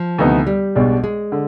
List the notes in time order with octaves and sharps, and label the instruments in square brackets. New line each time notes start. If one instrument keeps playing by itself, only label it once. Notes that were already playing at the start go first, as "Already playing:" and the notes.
Already playing: [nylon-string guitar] F3
[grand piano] D2 C3 D#3 B3 D#4
[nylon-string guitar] G3
[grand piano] B1 B2 G#3 D4
[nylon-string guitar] G#3
[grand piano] D3